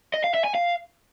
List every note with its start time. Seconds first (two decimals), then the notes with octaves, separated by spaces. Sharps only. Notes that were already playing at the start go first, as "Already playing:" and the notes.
0.14 D#5
0.24 F5
0.34 E5
0.44 G#5
0.55 F5